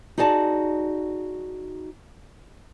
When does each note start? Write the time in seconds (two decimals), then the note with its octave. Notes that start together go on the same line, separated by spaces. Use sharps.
0.18 D#4 F#4 G#4 D5 G#5 A5